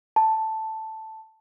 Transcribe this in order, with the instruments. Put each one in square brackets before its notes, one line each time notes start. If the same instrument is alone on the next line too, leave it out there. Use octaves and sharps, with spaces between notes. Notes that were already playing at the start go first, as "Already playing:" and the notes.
[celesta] A5